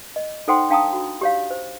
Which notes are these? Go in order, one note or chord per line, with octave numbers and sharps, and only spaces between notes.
D#5
D#4 A4 C5 F#5 G5 C6
D4 F5 G5 A5 A#5 D#6
F#4
G4 C#5 F5
C5